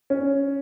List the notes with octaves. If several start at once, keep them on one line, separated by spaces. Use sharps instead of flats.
C#4